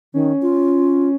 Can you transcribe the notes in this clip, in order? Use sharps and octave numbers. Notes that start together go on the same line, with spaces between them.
D#3 C#4
F4